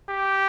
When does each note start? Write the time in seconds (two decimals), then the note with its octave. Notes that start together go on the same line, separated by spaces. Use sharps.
0.09 G4